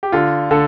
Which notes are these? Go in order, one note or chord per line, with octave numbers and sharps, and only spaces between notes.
G4
D3 F4
D3 A4